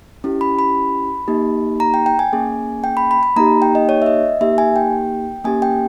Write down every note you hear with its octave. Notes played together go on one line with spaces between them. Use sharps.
C#4 E4 G4
B5
B5
A#3 D#4 G4
A#5
G5
G5
G#5
A#3 C#4 G#4
G5
B5
B5
B5
A#3 D#4 G4 A#5
G5
D#5
C#5
E5
D#5
A#3 D#4 G4 E5
G#5
G5
A#3 C#4 G4 G#5
G5